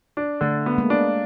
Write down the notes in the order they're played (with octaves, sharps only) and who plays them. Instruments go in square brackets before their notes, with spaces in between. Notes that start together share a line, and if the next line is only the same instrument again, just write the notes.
[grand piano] D4
[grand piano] D3 [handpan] A3
[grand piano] B3
[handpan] G#3 A#3
[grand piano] D4